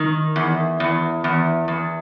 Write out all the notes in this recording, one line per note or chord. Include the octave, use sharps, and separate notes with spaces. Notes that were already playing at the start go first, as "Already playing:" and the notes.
Already playing: D#3
E2
E2
E2
E2